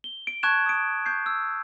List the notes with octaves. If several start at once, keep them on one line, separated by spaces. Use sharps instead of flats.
G7
D7
A5 C#6 F#6 G#6 E7
D#6 D7
C#6 G6 C7
E6